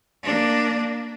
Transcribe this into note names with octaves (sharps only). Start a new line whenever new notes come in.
A#3 D4